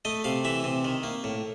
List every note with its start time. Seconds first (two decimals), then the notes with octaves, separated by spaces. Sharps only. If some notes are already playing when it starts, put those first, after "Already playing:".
0.05 A3 D#5
0.24 C3 F5
0.44 E3 E5
0.64 C3
0.85 D#3
1.03 A#3
1.24 A2